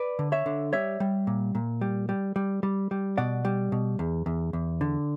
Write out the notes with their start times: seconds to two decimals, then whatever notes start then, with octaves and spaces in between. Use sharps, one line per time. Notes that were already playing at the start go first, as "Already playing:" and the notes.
Already playing: B4 D5
0.19 D3
0.32 C#5 E5
0.46 D3
0.73 G3 C#5 E5
1.00 G3
1.27 A#2
1.55 A#2
1.81 G3
2.09 G3
2.36 G3
2.63 G3
2.91 G3
3.18 B2 D5 F#5
3.45 G3
3.72 B2
3.99 E2
4.26 E2
4.53 E2
4.81 D3